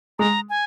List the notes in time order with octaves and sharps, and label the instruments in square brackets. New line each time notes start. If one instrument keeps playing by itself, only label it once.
[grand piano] G#3 [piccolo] A#5
[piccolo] G#5